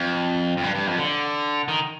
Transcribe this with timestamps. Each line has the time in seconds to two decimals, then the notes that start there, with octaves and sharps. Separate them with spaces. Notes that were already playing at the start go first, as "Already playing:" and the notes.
Already playing: F2
0.57 F2
0.63 G2
0.75 G2
0.87 F2
0.98 D3
1.68 D#3